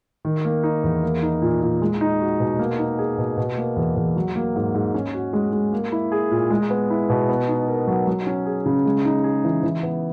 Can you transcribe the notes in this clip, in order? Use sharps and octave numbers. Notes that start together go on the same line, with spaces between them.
D#3
A#3
D#4
E2
A#3
D#4
A#2
A#2
G#3
D#4
F#4
B2
A#3
D#4
G#4
B2
B2
A#3
E2
E2
F#3
A#3
G#2
G#2
C#4
F#4
G#3
G#3
A#3
E4
G#4
A#2
G#3
B3
E4
B2
B3
D#4
A#4
F#3
F#3
C#4
G#4
C#3
G#3
D#4
G#4
E3
E3
B3